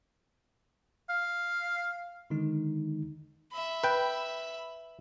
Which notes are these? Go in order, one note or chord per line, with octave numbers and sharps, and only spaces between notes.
F5
D3 D#3 G#3 D#4
E5 B5
B4 G5